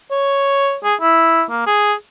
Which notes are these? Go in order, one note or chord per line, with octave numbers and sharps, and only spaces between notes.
C#5
G#4
E4
A#3
G#4